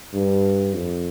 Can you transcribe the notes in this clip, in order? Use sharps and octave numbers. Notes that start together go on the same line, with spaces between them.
G2
F2